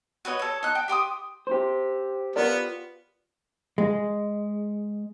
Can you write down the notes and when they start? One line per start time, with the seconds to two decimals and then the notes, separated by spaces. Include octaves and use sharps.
0.25 F#4 B4 C#5 D#5
0.39 A4 C#5
0.63 D#4 F#6
0.75 G5
0.88 G4 G5 C6 D#6
1.47 G4 C5
2.36 B3 F4 A#4 D5
3.78 G#3